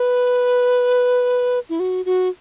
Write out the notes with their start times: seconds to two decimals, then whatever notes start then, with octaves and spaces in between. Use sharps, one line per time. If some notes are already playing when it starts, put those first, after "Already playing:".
Already playing: B4
1.69 E4
1.80 F#4
2.05 F#4